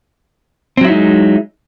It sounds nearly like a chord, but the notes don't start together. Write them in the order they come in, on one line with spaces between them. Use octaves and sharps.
C4 F#3 E4 D#4 G#3